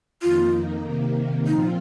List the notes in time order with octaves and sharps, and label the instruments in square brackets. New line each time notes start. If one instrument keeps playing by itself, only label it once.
[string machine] F2 D#3 A#3 D#4 [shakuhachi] F4
[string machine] C3 D#3 A#3
[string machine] A#2 F3 C4 F4 [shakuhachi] D#4